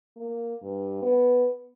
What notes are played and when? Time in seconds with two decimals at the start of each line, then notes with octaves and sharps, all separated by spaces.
0.17 A#3
0.63 G2
1.02 B3